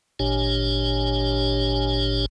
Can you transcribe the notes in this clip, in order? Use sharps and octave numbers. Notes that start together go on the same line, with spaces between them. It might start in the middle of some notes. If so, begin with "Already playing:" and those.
G#1 A#2 D4 G4 C#5 G#5